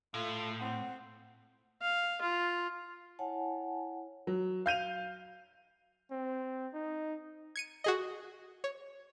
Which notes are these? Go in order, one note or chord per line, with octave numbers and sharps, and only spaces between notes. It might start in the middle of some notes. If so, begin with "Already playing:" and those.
A2 F4 A4
C4 F#5
F5
F4
E4 C#5 F#5 G#5 A5
F#3
F5 G6 D#7 F7
C4
D#4
G#6 C#7 D#7
F#4 G#4 D#5
C#5